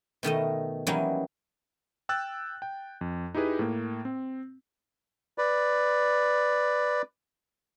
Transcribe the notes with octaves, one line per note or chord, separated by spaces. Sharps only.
B2 D#3 A3 D#5
E3 F#3 G3 A#3 C#4 D#4
G5 E6 F#6 A6
G5
F2
D#4 E4 G4 G#4 B4
A2 A#3
C4
B4 D5